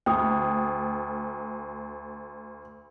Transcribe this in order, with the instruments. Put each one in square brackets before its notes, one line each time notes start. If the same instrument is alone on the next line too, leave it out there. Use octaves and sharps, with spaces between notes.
[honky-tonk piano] D2 [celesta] G5 D#6